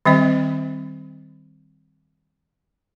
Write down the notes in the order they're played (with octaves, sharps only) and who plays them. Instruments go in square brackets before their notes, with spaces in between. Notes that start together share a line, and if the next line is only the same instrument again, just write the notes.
[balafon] D#3 G3 C4 D#5